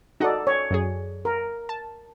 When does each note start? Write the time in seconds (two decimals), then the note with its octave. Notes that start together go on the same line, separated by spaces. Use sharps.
0.20 D#4 F#4 A4 D5 D#5 F#5
0.47 C#5
0.71 F#2 F#3 G#4
1.25 A#4
1.69 A5